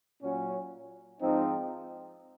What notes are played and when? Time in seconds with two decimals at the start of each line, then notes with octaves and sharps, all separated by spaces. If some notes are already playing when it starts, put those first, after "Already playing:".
0.22 A#2 F#3 C#4
1.21 G#2 F3 C4 D#4